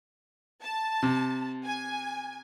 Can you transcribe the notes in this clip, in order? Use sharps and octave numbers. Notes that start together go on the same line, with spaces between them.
A5
C3
G#5